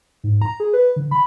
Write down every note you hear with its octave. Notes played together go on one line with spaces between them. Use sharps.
G#2
A#5
G#4
B4
D3
B5